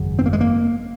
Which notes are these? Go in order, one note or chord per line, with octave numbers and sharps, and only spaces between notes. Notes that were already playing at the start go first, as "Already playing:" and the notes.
Already playing: G#1 F#2 C#3
C4
A#3
G#3
A#3